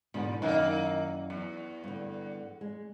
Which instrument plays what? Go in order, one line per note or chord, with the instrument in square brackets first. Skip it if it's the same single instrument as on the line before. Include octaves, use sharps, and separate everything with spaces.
[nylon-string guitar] E2 G#2 B2 [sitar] D3
[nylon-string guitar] F#2 E4 D5 [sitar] D#3 A#3
[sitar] E2
[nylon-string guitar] G2 D3
G#3